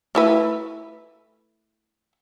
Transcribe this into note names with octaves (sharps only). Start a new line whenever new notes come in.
A3 E4 B4